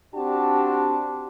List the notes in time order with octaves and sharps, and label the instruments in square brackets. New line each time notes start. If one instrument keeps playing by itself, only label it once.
[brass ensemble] C4 D4 F#4 G4 A5